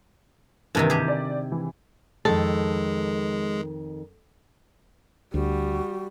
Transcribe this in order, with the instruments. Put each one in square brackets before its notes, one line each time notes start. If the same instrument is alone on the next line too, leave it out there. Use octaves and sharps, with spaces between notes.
[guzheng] G2 C3 D#3 [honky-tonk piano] E3 A#3 A5
[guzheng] G4 G#4
[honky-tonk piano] D5
E3
[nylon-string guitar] F2 D#3 A5 [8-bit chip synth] G#3 [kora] A4
[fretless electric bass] D2 [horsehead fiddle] G3 [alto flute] F#4